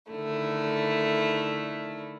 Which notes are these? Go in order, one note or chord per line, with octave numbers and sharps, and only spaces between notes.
D3 D#3 A3 E4